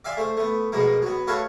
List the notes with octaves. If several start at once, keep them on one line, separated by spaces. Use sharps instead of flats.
D5 E5 F5 G#5 C6
A3 C5
A3 B3
B2 F3 G#3 A#3
F#3 B3
A3 F#4 A4 B4 C#5 F5